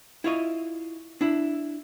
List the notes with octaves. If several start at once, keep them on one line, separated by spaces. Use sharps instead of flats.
E4 F4 C#5 D#5
D4 E4